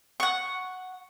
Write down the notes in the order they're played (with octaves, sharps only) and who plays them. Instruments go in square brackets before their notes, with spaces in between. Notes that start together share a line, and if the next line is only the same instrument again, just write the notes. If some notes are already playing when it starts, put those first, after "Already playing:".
[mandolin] F#5 C#6